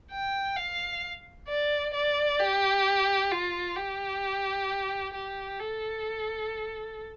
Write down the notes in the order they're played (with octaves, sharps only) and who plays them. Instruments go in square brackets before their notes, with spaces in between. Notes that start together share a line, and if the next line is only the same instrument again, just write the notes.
[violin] G5
F5
D5
D5
G4
F4
G4
G4
A4